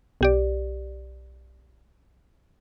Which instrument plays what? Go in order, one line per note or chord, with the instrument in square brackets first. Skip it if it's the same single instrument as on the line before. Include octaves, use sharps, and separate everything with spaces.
[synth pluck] B1 G4 D5